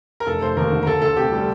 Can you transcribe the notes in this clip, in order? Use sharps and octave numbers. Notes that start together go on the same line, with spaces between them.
A#4
F1 A4
F1 C5
D#2 A#4
D3
A#4
D2 A4
D2 A4
C3 G4
G3 A4